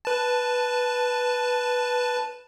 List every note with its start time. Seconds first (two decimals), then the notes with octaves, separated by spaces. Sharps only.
0.05 B4 A5